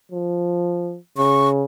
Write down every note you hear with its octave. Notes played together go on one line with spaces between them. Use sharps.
F3
C#3 C#6